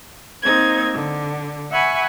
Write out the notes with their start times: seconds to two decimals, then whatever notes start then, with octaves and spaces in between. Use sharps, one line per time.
0.42 A#3 C4 D#4 C5 G#6
0.92 D3
1.70 E5 F#5 G#5 B5 C#6